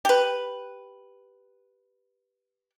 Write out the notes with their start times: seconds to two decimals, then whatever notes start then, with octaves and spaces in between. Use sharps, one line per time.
0.05 G4 B4